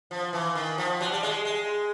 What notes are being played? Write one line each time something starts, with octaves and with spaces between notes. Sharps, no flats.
F3
E3
D#3
F3
F#3
G3
G#3
G#3